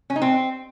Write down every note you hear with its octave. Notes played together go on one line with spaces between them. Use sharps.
C#4
D#4
C4